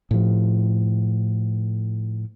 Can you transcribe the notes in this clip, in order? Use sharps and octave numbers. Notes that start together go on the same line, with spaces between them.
A2 F3